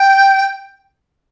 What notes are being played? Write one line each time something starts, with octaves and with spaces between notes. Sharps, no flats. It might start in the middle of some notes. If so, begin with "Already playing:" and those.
Already playing: G5